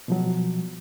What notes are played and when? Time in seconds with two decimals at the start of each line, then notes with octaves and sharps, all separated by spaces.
0.08 B2 F3 F#3